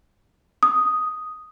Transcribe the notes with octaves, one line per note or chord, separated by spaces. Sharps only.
D#6